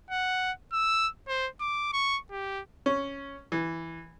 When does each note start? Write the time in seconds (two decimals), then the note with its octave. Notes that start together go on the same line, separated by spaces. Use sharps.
0.11 F#5
0.73 E6
1.28 C5
1.61 D6
1.93 C#6
2.31 G4
2.86 C#4
3.52 E3